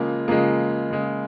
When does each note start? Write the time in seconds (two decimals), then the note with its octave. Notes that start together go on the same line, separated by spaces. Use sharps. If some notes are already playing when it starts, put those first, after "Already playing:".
Already playing: C#3 F3 G#3 A#3
0.28 C#3 F3 G#3 A#3
0.90 C#3 G#3